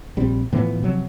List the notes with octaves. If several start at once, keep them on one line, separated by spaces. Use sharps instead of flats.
A#1 G3 C4
A2 E3 F3 B3
C3 F3 F#3 C4